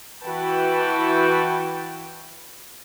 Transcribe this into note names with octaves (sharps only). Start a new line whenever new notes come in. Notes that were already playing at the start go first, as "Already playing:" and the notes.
E3 E4 F#4 B4 G5 A5